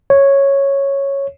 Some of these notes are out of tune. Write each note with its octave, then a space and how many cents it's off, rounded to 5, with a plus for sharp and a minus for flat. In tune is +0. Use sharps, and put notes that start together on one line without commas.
C#5 -5